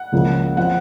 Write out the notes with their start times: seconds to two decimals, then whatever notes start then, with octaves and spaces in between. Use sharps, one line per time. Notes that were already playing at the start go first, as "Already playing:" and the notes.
Already playing: F#5
0.12 C#2 C#3 F3 A#3
0.57 F3 C4 F#5